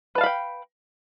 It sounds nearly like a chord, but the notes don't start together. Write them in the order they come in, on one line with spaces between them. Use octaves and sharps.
B4 A5 F5 B5 G5